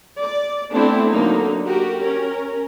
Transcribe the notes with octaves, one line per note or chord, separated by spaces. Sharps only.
D5
A3 B3 C4 D4 E4 A4
D3 F#3 A#3 D#4
F#4 G4 A#4
C#4 A#4